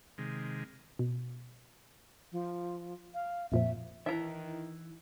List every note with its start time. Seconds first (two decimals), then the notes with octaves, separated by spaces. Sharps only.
0.18 C3 D#3 G#3
0.99 B2
2.32 F3
3.14 F5
3.52 F2 A#2 F3 E5
4.06 D#3 E3 D#4 E4 E5 A#5